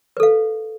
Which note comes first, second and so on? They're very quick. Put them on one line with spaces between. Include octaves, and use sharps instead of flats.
B4 A4 F5